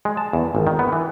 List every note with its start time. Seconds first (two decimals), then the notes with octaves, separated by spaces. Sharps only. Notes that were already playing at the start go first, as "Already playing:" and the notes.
0.05 G#3
0.17 A5
0.33 E2
0.55 G#1
0.67 D#3
0.79 B3
0.93 E3